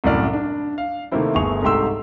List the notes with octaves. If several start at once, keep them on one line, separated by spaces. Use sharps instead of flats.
C2 F#2 A2 E4 D5 F6
D4
F5
C3 D#3 A3 A#3 C4 E4
G1 A3 G#4 C#6 F7
C2 G#2 A3 G4 C6 E6